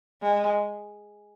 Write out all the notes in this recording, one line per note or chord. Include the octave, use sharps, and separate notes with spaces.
G#3